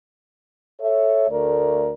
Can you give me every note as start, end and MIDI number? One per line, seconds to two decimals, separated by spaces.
0.80 1.29 69
0.80 1.29 73
0.80 1.29 76
1.29 1.91 38
1.29 1.91 57
1.29 1.91 70
1.29 1.91 74